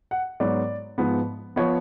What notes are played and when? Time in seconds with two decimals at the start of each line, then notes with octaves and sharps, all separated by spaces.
0.11 F#5
0.40 G#2 F#3 B3 D5
0.98 G#2 F3 B3
1.56 F3 B3 C#5